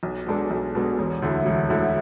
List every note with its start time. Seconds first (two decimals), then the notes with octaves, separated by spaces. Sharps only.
0.03 B1
0.26 B2 G#3 D4 A4
0.50 B1
0.75 B2 G#3 D4 A4
0.99 E1
1.22 D2 D3 A3 E4
1.46 E1
1.70 D2 D3 A3 E4